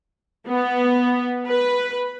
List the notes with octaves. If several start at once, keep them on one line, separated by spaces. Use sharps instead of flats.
B3
B4